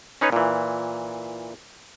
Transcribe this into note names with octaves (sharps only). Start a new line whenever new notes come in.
C#4 D#4 B4 C#5
A#2 E3